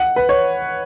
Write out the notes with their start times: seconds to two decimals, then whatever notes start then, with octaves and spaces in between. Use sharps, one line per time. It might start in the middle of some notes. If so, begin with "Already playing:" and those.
Already playing: F#5
0.16 B4
0.29 C#5